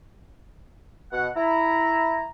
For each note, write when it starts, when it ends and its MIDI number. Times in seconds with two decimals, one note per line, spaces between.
1.12 1.27 47
1.12 1.27 78
1.36 2.26 64
1.36 2.26 82